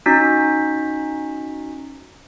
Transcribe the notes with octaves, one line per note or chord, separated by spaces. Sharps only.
C#4 D#4 F#4 B6